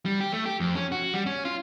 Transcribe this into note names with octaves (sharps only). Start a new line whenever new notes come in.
G3
G4
A3
G4
F2
C#4
F#4
G3
C#4
F4